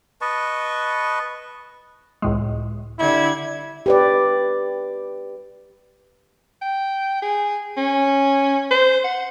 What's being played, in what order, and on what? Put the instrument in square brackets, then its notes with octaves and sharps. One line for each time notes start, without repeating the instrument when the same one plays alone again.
[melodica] B4 D#5 A5 C#6
[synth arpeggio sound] C#2 A2 G#3
[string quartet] D3 G3 G#6 [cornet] E4
[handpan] G4 B4 D5
[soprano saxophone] G5
G#4
C#4
C5
F#5